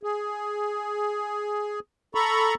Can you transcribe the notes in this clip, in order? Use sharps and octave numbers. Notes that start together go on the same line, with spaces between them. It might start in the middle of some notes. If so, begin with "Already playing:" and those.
G#4
A4 A#5 B5 C#6